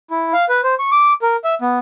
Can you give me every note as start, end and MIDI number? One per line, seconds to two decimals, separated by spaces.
0.10 0.33 64
0.33 0.45 77
0.49 0.61 71
0.63 0.75 72
0.79 0.90 85
0.92 1.13 86
1.22 1.36 70
1.44 1.55 76
1.62 1.79 59